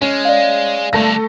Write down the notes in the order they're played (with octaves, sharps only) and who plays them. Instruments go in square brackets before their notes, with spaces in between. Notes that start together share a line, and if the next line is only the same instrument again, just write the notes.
[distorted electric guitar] G#3 [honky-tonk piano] C#4
[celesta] D5 F5
[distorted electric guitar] G2 D3 [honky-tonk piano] A3 A4 A#6